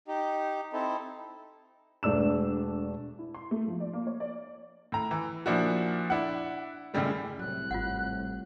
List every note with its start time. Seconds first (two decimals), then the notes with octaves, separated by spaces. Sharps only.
0.08 D#4 G4
0.73 C4 D#4 E4 A4
2.03 E1 A3 D4 E6 E7
3.19 E4
3.34 C6
3.51 A3
3.67 F3
3.80 D5
3.93 A#3
4.07 C#5
4.20 D5
4.92 A2 A#5
5.11 E3
5.46 A#2 F3 D4 E4 F#4
6.10 D4 E4 F#5
6.94 F#2 A2 C#3 G3 G#3
7.39 C2 A2 F#3 F#6
7.71 G#1 F4 F#4 F#5